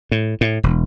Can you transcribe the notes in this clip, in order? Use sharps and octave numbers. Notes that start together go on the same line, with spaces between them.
A2
A2
E1